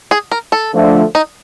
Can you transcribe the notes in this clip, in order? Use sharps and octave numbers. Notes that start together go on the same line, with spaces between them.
G#4
A#4
A4
D3 F3 A3
D#4